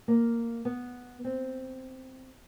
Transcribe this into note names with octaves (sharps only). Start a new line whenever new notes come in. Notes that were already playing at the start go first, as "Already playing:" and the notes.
A#3
B3
C4